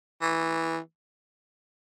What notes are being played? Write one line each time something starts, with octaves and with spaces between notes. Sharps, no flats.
E3